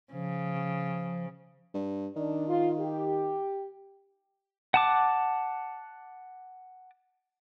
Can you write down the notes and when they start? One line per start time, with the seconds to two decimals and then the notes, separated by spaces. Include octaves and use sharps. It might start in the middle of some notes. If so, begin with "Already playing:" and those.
0.13 C#3 F3
1.73 G2
2.16 D#3 D4
2.48 F4
2.80 G4
4.74 F#5 A5 D6